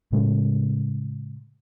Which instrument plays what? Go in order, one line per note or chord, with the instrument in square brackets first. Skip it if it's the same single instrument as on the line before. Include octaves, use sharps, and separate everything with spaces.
[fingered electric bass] A2 C#3 G#3